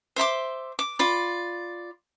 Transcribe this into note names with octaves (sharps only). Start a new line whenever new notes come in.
C5 E5 C6 D6
D6
F4 D5 B5